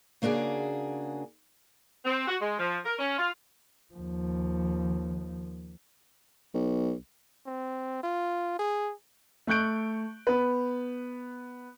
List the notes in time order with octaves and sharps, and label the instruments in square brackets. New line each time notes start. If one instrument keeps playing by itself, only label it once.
[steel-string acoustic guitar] C#3 A#3 D4 F#4 G#4
[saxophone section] C4
F#4
G#3
F3
A#4
C#4
F4
[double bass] D#2 F3
[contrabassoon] B1
[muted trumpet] C4
F4
G#4
[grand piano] A3 C#6 F#6 G6 D7
B3 B4